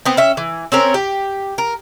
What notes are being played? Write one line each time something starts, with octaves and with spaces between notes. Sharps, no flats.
B3 C4
C#4 E5
E3
C4 C#4 A#4
G4
A#4